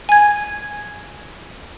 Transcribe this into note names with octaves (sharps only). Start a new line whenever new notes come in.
G#5 G#6